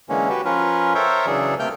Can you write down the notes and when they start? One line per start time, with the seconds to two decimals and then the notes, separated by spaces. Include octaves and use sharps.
0.09 D3 E3 G#3 A#3 C#4
0.29 F#4 G4 B4
0.45 F3 C#4 F4 A#4 B4
0.95 A4 A#4 C5 C#5 E5 G5
1.27 C#3 E3 F#3 D4 G#4 A4
1.59 C3 A3 A#3 G5 F6 G6